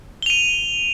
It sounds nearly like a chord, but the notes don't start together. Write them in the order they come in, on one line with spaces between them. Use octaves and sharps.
G7 F7 D#7